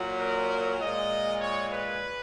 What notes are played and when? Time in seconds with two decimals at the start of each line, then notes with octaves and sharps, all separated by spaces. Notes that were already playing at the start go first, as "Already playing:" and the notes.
Already playing: A#2 F#3
0.20 A#4
0.80 A#2 G#3 D#5
1.41 C#5
1.71 B4